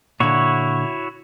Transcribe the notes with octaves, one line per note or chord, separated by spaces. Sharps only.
A#2 D3 E4 F#4 C#5